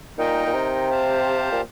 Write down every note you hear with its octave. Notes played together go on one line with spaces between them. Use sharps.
A#2 D#4 A#4 D#5 G5
A#2
C3
G4 C5 F5 A5
A#2